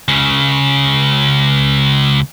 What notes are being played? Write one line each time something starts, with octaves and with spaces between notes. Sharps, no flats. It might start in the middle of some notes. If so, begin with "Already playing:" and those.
C#2 C#3